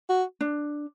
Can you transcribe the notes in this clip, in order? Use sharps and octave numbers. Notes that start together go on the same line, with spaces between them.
F#4
D4